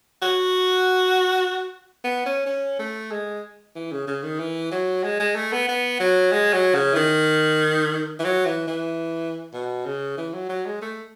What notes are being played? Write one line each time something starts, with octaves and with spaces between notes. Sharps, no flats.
F#4
B3
C#4
C#4
A3
G#3
E3
C#3
C#3
D#3
E3
F#3
G#3
G#3
A3
B3
B3
F#3
G#3
F#3
C#3
E3
D#3
E3
F#3
E3
E3
B2
C#3
E3
F#3
F#3
G#3
A3